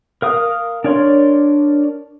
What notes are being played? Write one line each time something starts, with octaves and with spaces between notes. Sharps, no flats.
A#4 F5 D#6
D4 A#4 C#5 D5 C6